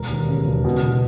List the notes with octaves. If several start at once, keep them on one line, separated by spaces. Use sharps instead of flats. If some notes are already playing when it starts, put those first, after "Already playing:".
Already playing: E1 A#4
D#2
C#3
E1
B2
B2